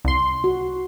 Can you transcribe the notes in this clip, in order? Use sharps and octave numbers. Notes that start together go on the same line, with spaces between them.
C2 C6
F#4